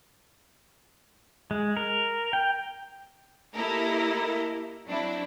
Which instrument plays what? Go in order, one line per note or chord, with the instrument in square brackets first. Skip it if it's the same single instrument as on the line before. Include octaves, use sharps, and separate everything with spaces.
[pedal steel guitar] G#3
A#4
G5
[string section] A#3 E4 G4 A4 A#4 D#5
F#3 C4 D4 E4